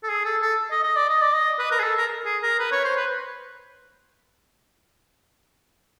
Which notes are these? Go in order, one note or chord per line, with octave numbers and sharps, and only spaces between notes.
A4
G#4
A4
A4
D#5
D#5
D5
D#5
D5
D#5
B4
A#4
G#4
A4
A#4
G#4
A#4
B4
C#5
C5
B4